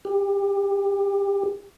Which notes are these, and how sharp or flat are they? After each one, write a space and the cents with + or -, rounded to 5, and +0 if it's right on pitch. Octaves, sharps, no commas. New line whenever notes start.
G4 +25